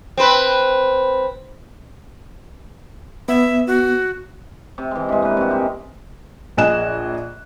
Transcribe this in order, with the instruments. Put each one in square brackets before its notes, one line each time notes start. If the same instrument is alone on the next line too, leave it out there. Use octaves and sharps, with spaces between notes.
[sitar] C4 B4
[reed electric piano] B3 [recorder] E5
[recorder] F#4
[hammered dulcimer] C3
E3 G#3
G2 G#3
A#3 B4
C3 F#4
G#3 G4
[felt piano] A#1 G#4 D#5 G#5 F#6 E7